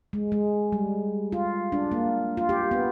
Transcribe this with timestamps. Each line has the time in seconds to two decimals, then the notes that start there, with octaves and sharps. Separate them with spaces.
0.13 G#3
0.32 G#3
0.72 G3
1.32 F4
1.72 D4
1.92 A#3
2.37 F4
2.49 G4
2.71 B3